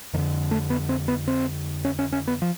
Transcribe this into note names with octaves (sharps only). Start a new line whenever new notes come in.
F2 D3 D#3
A3
B3
C4
B3
C4
C#4
C#4
C#4
B3
F3